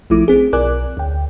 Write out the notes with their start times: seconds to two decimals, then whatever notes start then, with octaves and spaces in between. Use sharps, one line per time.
0.10 A#1 F3 A3 E4 D6
0.28 C4 G#4
0.53 B1 A#4 D5 G#5 D6 F#6
0.97 D2 G5